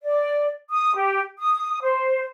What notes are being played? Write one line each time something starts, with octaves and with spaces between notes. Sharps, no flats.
D5
D#6
G4
D#6
C5